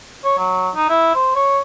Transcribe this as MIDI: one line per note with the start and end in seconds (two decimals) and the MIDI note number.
0.24 0.35 73
0.38 0.69 54
0.75 0.88 63
0.89 1.11 64
1.15 1.32 72
1.35 1.60 73